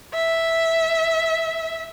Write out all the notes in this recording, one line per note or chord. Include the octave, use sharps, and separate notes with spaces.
E5